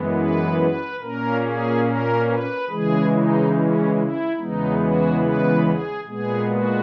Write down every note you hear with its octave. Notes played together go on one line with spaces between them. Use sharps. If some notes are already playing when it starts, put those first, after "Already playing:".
Already playing: F#2 E3 G#3 B3
B4
B4
A#2 A#3 C#4 A#4
G#4
A#4
B4
C#3 E3 G#3 G#4
D#4
C#4
E4
E2 C#3 E3 G#3 B3 D#4
F#4
B4
G#4
A#2 G#3 B3 G#4
F#4